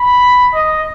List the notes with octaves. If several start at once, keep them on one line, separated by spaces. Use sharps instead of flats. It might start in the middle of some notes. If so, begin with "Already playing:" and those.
Already playing: B5
D#5